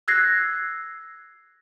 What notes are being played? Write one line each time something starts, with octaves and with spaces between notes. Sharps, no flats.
E6 F#6 G#6 A#6 C7